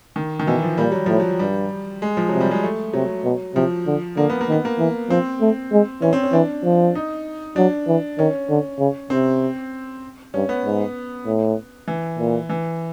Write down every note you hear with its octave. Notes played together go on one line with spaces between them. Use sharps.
D#3
D#3
B2 E3
F3
A#2 G3
F#3
A2 F3
F#3
G2 G3
G#3
F3
C3 F#3
G3
G#3
A3
C3 F#3
B2
C3 F3
D3
D3 A#3
B3
A#3
D#3 B3
A#3
E3
F3 C4
A3
G#3
E3 C#4
C4
C#4
E3 D4
F3
D#4
F#3 D4
E3
D#3 C#4
D3
C#3
C3 C4
G2 C#4
B3
G#2
A2
E3
A#2
E3